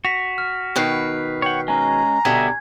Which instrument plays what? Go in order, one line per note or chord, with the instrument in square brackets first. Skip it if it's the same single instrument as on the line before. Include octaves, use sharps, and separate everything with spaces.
[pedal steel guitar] F#4 [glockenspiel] B6 F7
[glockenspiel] F6
[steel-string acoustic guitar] B2 D#3 B4 [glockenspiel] C#6 F#6 C7
[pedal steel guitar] C#5 F#5 [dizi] G5
[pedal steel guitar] G#3 C#4 [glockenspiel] G#5 [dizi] A#5
[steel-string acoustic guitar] B2 D3 G3 [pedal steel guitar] G#4 E5 [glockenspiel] G#6